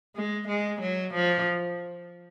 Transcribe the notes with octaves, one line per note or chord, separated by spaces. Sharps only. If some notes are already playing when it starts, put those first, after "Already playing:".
G#3
G#3
F#3
F3